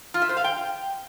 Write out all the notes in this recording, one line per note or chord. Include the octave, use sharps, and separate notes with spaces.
F4
E5
C5
F5
G5